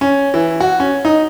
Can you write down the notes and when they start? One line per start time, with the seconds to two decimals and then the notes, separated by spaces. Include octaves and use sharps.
0.01 C#4
0.34 E3
0.60 F#4
0.80 C#4
1.05 D#4